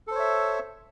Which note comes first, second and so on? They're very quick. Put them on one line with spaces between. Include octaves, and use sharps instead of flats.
A4 C5 C#5 E5